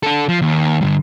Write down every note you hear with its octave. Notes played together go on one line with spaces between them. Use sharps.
D4 A4
F3
D#2
G2 D3